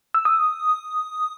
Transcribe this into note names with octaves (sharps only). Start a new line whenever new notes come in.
E6
D#6